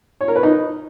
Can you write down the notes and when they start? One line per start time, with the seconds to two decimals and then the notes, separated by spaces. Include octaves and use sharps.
0.21 C#5
0.28 A#4
0.36 B4
0.43 D#4